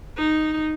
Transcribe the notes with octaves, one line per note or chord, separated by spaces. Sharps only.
D#4